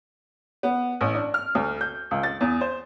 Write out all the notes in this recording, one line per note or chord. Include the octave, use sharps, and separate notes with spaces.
B3
A1
D4
F6
D2
G6
C#2
A6
E2
C5